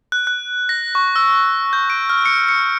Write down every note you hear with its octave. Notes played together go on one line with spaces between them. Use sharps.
F#6
F#6
A#6
C#6
E6
G6
D7
F6
C#7
C#7